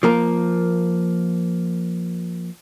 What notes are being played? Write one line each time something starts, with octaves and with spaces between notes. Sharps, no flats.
F3 A#3 A#4